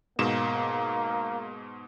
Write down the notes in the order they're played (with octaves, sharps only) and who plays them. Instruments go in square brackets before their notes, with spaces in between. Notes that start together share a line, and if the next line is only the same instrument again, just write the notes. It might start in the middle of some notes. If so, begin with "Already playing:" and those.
[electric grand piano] G#2 B2 E7 [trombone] A#3